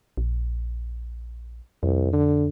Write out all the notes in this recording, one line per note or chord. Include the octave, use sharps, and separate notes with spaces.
A#1
C2 F2
D3